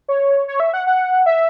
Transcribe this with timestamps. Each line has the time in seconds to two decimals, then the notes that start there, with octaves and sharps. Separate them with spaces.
0.08 C#5
0.48 C#5
0.60 E5
0.74 F#5
0.87 F#5
1.26 E5